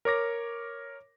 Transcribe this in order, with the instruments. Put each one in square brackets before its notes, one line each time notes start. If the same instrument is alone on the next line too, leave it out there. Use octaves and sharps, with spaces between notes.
[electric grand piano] A#4 C#5 D6 A#6